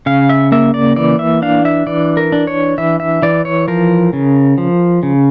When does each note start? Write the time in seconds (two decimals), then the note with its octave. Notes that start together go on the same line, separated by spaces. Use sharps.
0.06 C#3 F5
0.29 E5
0.52 A#3 E5
0.74 D5
0.96 E3 D5
1.19 E5
1.42 D4 F5
1.65 E5
1.87 E3 D5
2.17 A#4
2.32 D4
2.47 C#5
2.78 E3 E5
3.00 E5
3.22 E3 D5
3.45 C#5
3.68 F3 A#4
4.13 C#3
4.58 F3
5.03 C#3